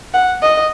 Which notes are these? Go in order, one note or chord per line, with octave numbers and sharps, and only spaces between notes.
F#5
D#5